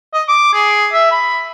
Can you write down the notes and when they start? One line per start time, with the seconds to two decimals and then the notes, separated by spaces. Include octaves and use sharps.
0.14 D#5
0.28 D6
0.54 G#4
0.93 E5
1.11 B5